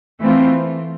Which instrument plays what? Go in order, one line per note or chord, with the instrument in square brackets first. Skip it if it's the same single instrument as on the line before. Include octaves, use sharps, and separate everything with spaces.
[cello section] E3 A3 C4 F4